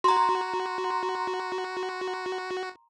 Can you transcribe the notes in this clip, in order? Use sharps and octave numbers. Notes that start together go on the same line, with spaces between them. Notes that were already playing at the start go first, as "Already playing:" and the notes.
F#4 A#5 C6